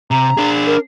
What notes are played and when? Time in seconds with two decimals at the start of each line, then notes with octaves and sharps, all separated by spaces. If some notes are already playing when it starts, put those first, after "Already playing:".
0.11 C3 A#5
0.37 D4 G#4
0.66 A#4